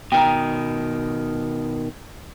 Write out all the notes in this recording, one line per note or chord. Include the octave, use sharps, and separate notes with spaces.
B2 D#3 G5 A#5